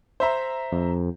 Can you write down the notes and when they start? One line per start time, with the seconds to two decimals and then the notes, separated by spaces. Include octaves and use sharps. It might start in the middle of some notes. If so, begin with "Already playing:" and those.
0.20 C5 E5 A#5
0.72 F2